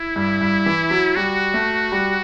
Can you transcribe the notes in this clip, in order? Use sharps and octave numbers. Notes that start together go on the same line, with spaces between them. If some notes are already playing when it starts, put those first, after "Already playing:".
Already playing: E4
G2
G2
E3
F#3
G3 F#4
A3
G3